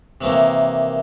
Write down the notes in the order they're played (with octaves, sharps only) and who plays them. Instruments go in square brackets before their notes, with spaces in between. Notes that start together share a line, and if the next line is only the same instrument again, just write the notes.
[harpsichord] C3 D#3 E3 A#3